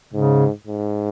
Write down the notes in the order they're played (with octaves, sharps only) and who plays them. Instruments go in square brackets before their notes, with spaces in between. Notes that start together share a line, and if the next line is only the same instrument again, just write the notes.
[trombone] G#2 [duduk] C#3
[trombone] G#2